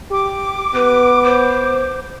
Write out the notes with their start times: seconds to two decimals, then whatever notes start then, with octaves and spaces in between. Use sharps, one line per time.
0.11 G4 D6
0.75 B3 B4
1.25 C5